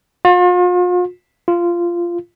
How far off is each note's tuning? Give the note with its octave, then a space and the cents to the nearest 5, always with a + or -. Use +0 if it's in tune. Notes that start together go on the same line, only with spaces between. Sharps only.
F4 +40
F4 -15